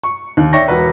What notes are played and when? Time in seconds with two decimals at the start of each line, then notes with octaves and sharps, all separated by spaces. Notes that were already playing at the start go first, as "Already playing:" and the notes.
0.03 C#6
0.37 D#2
0.53 C#5 D5 E5 G5 C#6 A#6
0.68 E1 F#4 B4